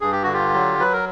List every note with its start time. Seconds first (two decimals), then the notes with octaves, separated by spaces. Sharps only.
0.01 G2 G#4
0.12 G4
0.23 D3 F#4
0.33 F4 G4
0.53 F#3
0.79 F#3 B4
0.93 A#4